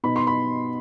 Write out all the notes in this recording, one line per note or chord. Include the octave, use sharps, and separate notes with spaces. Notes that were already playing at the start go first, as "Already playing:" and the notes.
B2 B3 D#4 B5
C6
B5